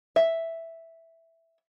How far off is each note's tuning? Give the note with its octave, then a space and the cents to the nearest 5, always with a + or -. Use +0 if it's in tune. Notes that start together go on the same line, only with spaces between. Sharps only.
E5 +0